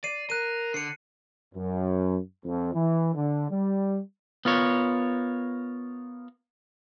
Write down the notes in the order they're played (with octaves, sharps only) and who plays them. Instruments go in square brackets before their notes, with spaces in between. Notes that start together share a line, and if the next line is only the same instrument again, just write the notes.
[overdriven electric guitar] D5 [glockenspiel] C7 D#7
[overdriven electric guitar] A#4 [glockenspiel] F#6 D#7
[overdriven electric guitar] D3 [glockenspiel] C7 C#7
[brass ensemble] F#2
F2
E3
D3
G3
[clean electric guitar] B3 F4 A#4 C#5